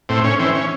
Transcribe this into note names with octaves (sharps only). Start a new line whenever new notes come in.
A2 C4
C#4
E3 C4
C#4